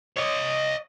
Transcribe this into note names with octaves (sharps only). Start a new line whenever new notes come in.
C#5 D#5